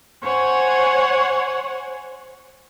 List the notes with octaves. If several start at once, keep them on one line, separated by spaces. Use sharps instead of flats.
C5 C#5 F#5 G#5